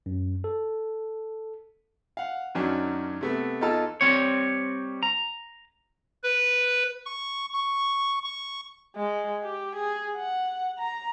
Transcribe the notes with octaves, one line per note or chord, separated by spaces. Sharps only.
F#2
A4
F5 F#5
F#2 D#3 F#3 C#4 D4
C3 A3 B3
E2 D#4 F4 A4 A5 F6
G3 C4 C#5
A#5
B4
C#6
C#6
C#6
G#3
G4
G#4
F#5
A#5